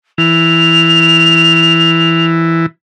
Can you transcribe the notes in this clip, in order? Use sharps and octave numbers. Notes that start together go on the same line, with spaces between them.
E3 F7